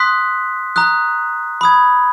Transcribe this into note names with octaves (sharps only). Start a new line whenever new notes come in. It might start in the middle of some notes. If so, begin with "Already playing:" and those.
Already playing: C6 D#6 F#6 B6
A#5 D#6 F#6
B5 D#6 G#6